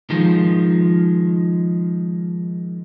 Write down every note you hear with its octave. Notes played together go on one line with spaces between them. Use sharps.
D#3 F3 G#3